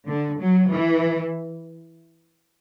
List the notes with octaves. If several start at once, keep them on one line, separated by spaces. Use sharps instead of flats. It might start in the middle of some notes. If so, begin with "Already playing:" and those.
D3
F#3
E3